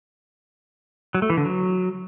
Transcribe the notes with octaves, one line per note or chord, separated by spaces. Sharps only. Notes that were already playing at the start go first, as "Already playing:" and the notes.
F#3
A3
E3
D3
F#3